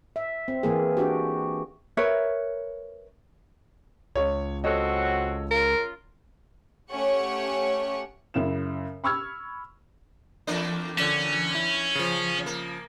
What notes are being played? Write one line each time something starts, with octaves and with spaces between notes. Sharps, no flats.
E5
C4
E3 A#3 G#4
D4 F#4 G4
A#4 B4 C#5 E5
C#2 C#5
F#3 C4 F#4 A4 C#5 D#5
C#3 F4 A#4
A3 C#4 G4 C#5 F#5 C#6
F#2 C#3 E4 E7
B5 C#6 E6 F6 G#6
E2 A#3 D4
D3 C#4 D5 E7
E4
C#3 F3
A#3